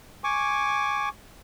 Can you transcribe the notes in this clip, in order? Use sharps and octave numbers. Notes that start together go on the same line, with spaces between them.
G#5 C#6 D6